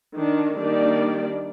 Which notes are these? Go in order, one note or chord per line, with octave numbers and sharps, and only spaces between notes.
D#3 D4
D#3 G3 A#3 D4 D5